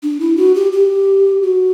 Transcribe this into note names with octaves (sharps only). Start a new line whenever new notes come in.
D4
E4
F#4
G4
G4
F#4